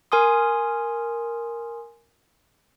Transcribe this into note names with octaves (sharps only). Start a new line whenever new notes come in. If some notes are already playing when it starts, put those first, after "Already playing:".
A#4 G#5 C6 D#6